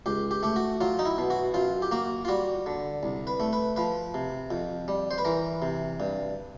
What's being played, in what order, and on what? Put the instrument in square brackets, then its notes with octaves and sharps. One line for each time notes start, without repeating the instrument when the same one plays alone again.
[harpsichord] C#2 G4
G4
A3 G4
F#4
F#3 F4
D#4
E4
B2
F#4
F#2 F4
G4
A#3 F#4
F4
G3 F#4
D3
C2
B4
A3
B4
F3 B4
C3
F2
G3
C5
B4
E3 A#4
C3
G2